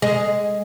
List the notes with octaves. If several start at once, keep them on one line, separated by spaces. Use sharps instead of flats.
G#3